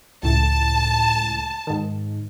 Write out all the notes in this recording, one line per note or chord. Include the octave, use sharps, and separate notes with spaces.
C#2 A2 A5
G#2 D#3